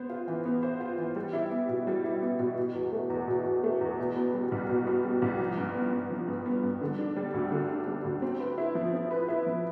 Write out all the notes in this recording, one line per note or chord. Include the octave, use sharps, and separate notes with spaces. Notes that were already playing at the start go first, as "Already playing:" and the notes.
Already playing: B3 C5
F4
E3
B3
C5
F4
E3
G3
E4
B3
B2
G3
E4
B3
B2
B2
E2
A3
E2
B2
E2
A3
E2
B2
B3
G3
C2
B2
B3
G3
C2
F3
G2
B3
G2
F3
G2
B3
G2
D3
D4
G3
D2
D3
D4
G3
D2
C4
B4
E4
F3
C4
B4
E4
F3